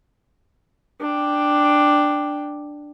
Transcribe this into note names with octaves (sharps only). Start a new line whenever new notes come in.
D4 G5